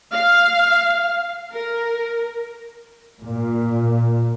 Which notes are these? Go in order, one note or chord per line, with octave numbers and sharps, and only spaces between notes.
F5
A#4
A#2